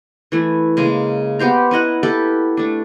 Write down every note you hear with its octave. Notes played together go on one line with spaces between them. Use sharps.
E3 A3 E4
C#3 G#3 A#3
B3 G4 C5 A#5
C#4 E4 D#5 F#5
E4 G4 A4 B4
A3 D4